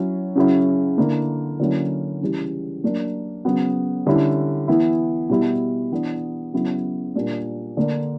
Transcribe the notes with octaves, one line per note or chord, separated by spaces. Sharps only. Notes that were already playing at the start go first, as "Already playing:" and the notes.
Already playing: F#3 C#4 E4
C#3 F#3 C#4 E4
D3 A#3 E4
D3 F#3 A#3 C#4 E4
C#3 E3 G3
F#3 A#3 D4
C#3 F#3 B3
D3 G3 C#4 E4
E3 B3 E4
B2 G3 B3 E4
E3 B3 D4
C#3 F#3 B3 E4
A#2 G3 A#3 D4
D3 A#3 D4